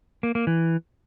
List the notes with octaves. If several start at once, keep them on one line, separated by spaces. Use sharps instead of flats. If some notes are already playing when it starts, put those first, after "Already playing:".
A#3
A#3
E3